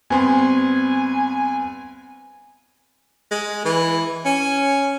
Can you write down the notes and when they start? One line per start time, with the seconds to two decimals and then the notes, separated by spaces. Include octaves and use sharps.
0.10 G2 B3 C4 G#5 C6
3.31 G#3
3.65 E3
4.26 C#4